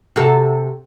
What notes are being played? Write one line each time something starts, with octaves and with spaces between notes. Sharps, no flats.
C3 F#4 A4